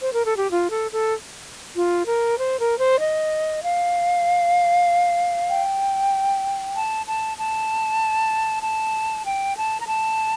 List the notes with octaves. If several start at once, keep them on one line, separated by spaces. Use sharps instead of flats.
C5
A#4
A4
G4
F4
A4
A4
F4
A#4
C5
A#4
C5
D#5
F5
G5
A5
A5
A5
A5
G5
A5
A#5
A5